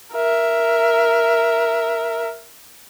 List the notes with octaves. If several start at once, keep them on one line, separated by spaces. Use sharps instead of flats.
A#4 E5